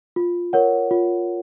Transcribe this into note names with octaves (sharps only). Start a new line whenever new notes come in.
F4
A#4 C#5 F#5
F4